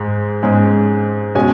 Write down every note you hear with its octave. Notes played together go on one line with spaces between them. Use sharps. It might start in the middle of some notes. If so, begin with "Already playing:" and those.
Already playing: G#2 G#3
G#2 G#3 C#4
B2 G#3 C#4 G#5